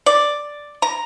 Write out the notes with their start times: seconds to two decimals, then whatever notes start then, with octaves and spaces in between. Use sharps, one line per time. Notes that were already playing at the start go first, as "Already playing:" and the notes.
0.06 D5
0.82 A#5